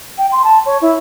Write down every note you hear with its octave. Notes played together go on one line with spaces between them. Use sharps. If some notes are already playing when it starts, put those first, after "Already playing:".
G5
C6
A5
C#5
E4